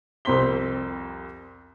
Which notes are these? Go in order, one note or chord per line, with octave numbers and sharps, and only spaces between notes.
C2 F2 C4 C6 B6 G7